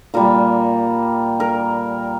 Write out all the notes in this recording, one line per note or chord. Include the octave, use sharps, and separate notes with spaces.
A#2 G3 A#4
A#4